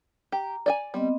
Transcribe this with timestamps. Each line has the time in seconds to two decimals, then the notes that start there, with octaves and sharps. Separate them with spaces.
0.32 G4 A#5
0.66 D5 D#5 G#5
0.94 G3 B3 C4 D#5